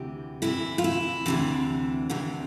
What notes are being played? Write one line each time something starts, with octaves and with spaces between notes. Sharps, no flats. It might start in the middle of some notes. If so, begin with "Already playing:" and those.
Already playing: D2 C3 E3 G4
D2 C3 E3 E4
F4
E4
D2 C3 E3 D4
D2 C3 E3